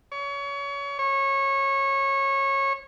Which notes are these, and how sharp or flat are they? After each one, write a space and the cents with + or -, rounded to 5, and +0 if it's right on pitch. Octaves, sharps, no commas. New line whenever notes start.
C#5 +30
C#5 -20